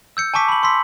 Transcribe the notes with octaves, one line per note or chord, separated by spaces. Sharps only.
E6 G6 C#7
G#5 A5 C#6 D6 B6
B5 F#7
C6 E6 B6